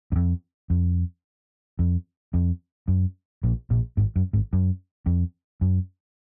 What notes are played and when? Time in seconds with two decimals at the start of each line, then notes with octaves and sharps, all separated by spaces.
0.12 F#2
0.16 F2
0.70 F2
1.79 F2
2.34 F2
2.88 F#2
3.43 A#1 A#2
3.71 A#1 A#2
3.97 G#1 G#2
4.16 F#2
4.33 G#1 G#2
4.53 F#2
5.06 F2
5.61 F#2